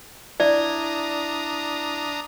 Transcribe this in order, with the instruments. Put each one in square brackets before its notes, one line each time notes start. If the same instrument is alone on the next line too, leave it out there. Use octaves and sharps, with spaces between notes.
[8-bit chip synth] D4 A#5 D#6 [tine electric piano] E4 E5 [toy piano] D5